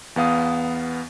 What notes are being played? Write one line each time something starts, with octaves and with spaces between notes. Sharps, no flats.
E2 B3 F5 D#6